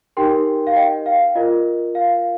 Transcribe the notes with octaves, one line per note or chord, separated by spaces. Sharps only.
D#4 G4 A#4 G5 C6
F5
D#5 G5
F5
F4 A#4 D#5
F5